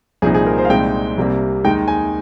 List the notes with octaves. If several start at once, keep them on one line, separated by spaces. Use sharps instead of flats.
C2 A#2 F3 C4 D#4 G#4
G#4
A#4
C5
F5
C2 A#2 G#3 C4 D#4 G5
C2 C3 G3 A#3
D#2 D#3 G#3 D#4 G5
G#5